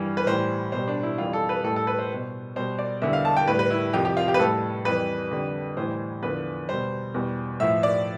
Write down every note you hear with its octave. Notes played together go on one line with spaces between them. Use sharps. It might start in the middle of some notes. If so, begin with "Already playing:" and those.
Already playing: G2 E3 G3
B4
A2 E3 G3 C5
B2 G3 C5
D4
E4
F2 E3 G3 F4
A4
B4
A2 G3 A4
A4
B4
C5
B2 G3
B2 G3 C5
D5
E2 D3 G3 E5
F5
A5
G5
A2 G3 B4
B4
E4
F2 C3 F3 G4
G4
F4
G4
B4
A2 G3 A4
F2 E3 G3 B4
F2 D3 G3
A2 E3 G3 C5
E2 D3 F3 B4
B2 G3 C5
E2 B2 G3
A2 F3 E5
D5